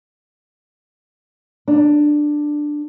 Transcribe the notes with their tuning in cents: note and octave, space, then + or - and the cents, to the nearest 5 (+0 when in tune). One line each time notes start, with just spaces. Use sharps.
D4 +10